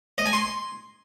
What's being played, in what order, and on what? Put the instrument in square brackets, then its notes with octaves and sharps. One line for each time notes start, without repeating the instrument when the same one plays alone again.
[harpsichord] D#5
G#5
C6